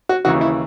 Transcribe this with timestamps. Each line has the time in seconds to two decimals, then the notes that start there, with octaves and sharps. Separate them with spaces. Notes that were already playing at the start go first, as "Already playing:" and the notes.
0.09 F#4
0.25 D#2 C#3 E3 F#4
0.41 E4